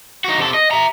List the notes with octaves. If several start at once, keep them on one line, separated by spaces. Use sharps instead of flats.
D#4 F#4
C3 A4
D#5
E5 A#5